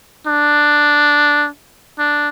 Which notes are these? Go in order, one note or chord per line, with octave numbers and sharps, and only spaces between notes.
D4
D4